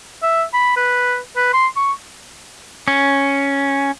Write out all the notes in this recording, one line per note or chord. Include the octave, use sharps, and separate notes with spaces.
E5
B5
B4
B4
C6
C#6
C#4